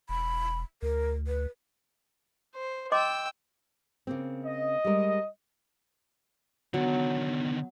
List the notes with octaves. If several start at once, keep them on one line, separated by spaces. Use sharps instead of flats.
E1 B5
D2 A#4
B4
C5
D#5 G5 C6 D6 E6
C#3 A#3 C4
D#5
G3 G#3 A#4
D3 D#3 F#3 B3